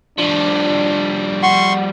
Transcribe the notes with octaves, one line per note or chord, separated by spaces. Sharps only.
F3 G3 D4
F#5 C6 C#6